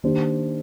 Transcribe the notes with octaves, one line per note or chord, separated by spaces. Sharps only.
D#3 A#3 D4 G4 C5